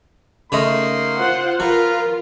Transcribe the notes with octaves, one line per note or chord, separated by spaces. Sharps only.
C#3 A3 A#3 D#4 D#5 C6
F4 C5 F#5
F3 F4 A#4 B4 F5 A#5